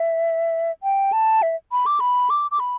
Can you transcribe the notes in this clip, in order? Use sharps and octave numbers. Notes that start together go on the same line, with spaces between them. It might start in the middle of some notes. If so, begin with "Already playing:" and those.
Already playing: E5
G5
A5
E5
B5
D6
B5
D6
D6
B5